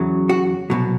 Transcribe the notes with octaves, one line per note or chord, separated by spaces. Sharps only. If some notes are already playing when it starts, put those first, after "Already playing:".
Already playing: E2 C#3 F#3
F#4
C2 B2 F#3